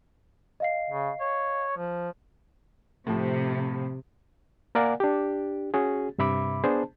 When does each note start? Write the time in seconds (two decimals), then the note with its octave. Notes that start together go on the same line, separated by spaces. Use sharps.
0.60 D#5 F5 C7
0.90 C#3
1.21 C#5
1.77 F3
3.07 A2 C3 F3
4.75 A#3 A#4 D5 F5 F#5 G#5
5.00 D4 G4
5.74 C#4 F#4 G#4
6.18 G2 C3 E5 B5 D6
6.64 B3 D4 G#4 C5 A5